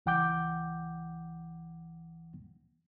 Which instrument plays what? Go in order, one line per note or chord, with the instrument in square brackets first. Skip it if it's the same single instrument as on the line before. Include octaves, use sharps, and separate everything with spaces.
[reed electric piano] C#2 E3 F#5 G5 D6 G6